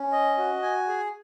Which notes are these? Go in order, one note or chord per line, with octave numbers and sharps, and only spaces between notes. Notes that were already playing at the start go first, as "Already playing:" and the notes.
Already playing: C#4
D#5
F#4
G#5
G#4